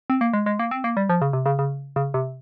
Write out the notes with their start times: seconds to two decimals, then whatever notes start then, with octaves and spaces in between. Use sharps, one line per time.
0.10 C4
0.21 A#3
0.33 G#3
0.46 G#3
0.59 A#3
0.71 C4
0.84 A#3
0.97 G3
1.09 F3
1.22 C#3
1.33 C3
1.46 C#3
1.59 C#3
1.96 C#3
2.14 C3